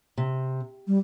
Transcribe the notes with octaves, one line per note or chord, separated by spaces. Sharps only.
C3
G3